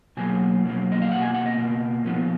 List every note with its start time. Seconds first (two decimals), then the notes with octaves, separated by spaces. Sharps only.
0.17 B2 F#3 A#3 G#5
0.64 B2 F#3 A#3
0.92 D#5
1.02 F5
1.11 B2 A#3 F#5
1.22 G#5
1.34 F#5
1.46 D#5
1.57 B2 A#3
2.04 A#2 F3 B3